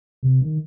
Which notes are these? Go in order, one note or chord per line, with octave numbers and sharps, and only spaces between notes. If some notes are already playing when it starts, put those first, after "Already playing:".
C3
D#3